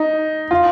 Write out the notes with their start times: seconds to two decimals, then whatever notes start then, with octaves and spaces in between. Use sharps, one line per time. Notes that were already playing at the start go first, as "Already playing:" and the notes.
Already playing: D#4
0.51 F4